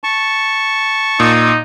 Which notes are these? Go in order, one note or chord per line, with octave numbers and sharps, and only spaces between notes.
A5 C#6
A#2 D#4